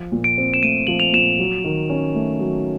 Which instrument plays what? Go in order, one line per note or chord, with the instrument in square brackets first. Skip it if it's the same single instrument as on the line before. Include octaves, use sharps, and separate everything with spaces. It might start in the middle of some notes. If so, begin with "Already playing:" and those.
Already playing: [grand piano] F3
A#2
[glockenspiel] D7
[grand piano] C4
[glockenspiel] E7
[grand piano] A3 [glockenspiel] D#7
[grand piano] F3 [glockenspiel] F#7
[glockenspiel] F7
[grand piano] A#2 [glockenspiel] E7
[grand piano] F#3
D#3
C#4
A3
F#3